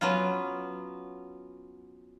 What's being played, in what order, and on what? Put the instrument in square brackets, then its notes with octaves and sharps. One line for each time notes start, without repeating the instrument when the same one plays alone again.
[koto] F#3 B3 C#4 F4